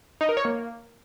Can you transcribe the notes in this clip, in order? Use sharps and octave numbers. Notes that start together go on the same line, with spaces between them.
D#4
A#4
C#5
A#3